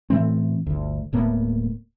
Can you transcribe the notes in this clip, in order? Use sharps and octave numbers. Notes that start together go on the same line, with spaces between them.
A2 E3 A3 C4
G1 D2
D1 A2 A#3 B3